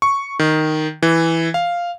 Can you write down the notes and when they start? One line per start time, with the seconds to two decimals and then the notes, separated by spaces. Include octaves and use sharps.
0.02 C#6
0.39 D#3
1.03 E3
1.54 F5